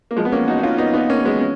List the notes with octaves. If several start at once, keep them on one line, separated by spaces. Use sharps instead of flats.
A#3
F3 G#3
B3
A#3 C#4
D#4 F#4
D#4
C#4 F4
B3 D#4
B3 D#4
A#3 C#4
G#3 B3
C#4